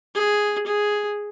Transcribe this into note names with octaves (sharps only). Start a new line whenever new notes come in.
G#4
G#4